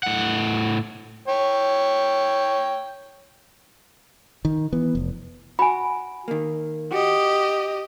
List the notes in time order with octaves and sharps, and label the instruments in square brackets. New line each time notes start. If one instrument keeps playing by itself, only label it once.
[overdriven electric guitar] A2 F#5
[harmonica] C#5 G5
[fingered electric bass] D#3
E3 B3
F1
[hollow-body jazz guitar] F#4 [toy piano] G#5 B5
[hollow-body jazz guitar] D#3 A#3
[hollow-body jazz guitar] F#4 [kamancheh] G4 D#5